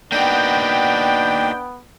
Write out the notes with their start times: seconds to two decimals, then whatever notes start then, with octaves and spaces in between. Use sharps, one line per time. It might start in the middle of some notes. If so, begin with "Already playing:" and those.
0.12 A#3 B3 D4 D#4 F#4 G5